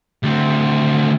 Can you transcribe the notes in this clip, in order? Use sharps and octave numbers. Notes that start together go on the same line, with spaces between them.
D2 C4